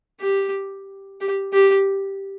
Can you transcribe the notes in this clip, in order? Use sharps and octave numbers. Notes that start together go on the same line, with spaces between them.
G4
G4
G4